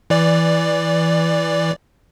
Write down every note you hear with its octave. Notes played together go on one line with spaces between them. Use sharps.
E3 D5